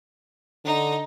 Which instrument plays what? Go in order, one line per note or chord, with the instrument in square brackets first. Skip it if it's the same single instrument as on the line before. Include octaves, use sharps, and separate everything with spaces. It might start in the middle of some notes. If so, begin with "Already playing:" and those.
[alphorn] D3 [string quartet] D#4